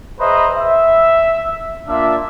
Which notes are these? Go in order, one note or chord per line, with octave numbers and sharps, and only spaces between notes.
G#4 B4 C5 D#5 E5 A#5
E5
A#3 D4 F4 D5 E5